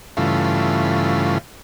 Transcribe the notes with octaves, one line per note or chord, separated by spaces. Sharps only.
G2 C#3 E3 A3 F4